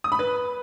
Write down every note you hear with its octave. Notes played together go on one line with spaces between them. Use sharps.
D#6
B5
B4